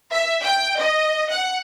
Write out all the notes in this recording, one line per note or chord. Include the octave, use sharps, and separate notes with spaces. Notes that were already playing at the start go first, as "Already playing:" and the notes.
E5
G5
D#5
F#5